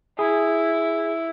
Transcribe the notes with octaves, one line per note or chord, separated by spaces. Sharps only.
E4 G#4